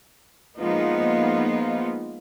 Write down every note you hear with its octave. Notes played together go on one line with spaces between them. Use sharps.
F3 G#3 A#3 B3 D#4 F4